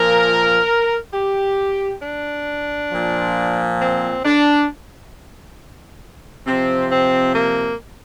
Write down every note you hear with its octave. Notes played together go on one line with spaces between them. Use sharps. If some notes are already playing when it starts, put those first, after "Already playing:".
Already playing: A#2 F3 A#4
G4
D4
A#2 F3
C4
D4
C3 F3 C4
C4
A#3